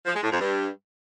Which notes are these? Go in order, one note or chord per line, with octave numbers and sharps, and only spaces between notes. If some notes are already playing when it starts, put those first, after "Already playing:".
F3
G#3
A2
F2
G2